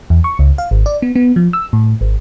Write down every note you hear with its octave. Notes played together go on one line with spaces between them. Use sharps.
E2
C#6
C#2
F5
G#1
D5
B3
B3
F3
E6
A2
G#1